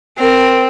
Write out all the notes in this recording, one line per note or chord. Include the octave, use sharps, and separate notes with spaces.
C4 A#4